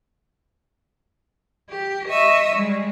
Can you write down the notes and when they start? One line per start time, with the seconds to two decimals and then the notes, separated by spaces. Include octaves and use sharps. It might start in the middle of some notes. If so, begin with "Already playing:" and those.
1.69 G4
2.07 D#5 E5 C#6 D#6 E6
2.54 G3 G#3